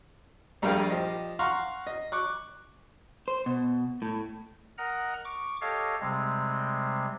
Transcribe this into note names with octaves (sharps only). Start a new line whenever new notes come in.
A#1 G2 A3 A#4 F5 G5
F3 G4 D#5
F5 F#5 A#5 C6 C#6
D#5
C#6 D6 F#6
C5
B2
A2
A#4 D#5 F#5 A#5
C#6 D6
G4 A4 C#5 D#5 F5
C3 G3 G#3 C4